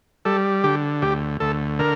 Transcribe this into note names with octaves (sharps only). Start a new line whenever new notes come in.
G3 A4
D3 G4
D2 G4
D2 A4
D3 A#4